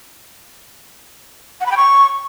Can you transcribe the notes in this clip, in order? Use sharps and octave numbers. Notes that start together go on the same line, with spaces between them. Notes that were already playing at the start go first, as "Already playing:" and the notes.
F#5
B5
G5
C#6